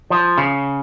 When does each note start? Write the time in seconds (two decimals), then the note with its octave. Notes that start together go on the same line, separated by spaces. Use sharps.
0.10 F3
0.38 C#3